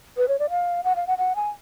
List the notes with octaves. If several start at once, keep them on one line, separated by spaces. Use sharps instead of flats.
B4
C#5
D5
F5
F#5
F5
F#5
F#5
G#5